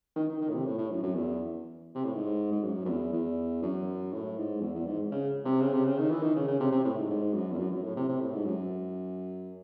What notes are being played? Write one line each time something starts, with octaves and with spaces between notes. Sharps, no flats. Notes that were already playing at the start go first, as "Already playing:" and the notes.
D#3
D#3
D#3
A2
C3
A2
A2
F#2
F#2
E2
C3
A2
G#2
G#2
F#2
F#2
E2
E2
F#2
A2
G#2
E2
E2
G#2
C#3
C3
C#3
C3
C#3
D#3
E3
D#3
C#3
C#3
C3
C3
A2
G#2
G#2
F#2
E2
F#2
F#2
A2
C3
C3
A2
G#2
F#2